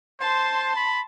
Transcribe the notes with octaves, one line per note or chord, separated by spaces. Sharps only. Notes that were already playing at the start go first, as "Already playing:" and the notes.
C5 A5 C6
B5